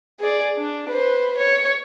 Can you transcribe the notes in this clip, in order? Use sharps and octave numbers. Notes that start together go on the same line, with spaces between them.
G#4 D5
D4
B4 C5
C#5